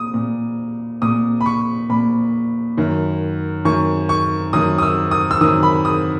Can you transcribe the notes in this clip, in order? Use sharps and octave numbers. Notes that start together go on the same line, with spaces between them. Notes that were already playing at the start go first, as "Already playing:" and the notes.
Already playing: A#2 D#6
A#2
A#2 D#6
B5
C#6
A#2 B5
F#2 D#3
F#2 D#3 C#6
C#6
F#2 D#3 D#6
D#6
E6
D#6
E6
F#2 D#3 D#6
B5
D#6